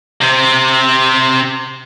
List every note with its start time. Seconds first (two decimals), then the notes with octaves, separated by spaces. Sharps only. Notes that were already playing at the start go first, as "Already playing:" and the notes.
0.21 C3 C4